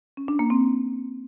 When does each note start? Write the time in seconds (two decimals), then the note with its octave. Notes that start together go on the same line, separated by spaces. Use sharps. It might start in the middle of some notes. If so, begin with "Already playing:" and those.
0.17 C#4
0.28 D4
0.39 A#3
0.50 C4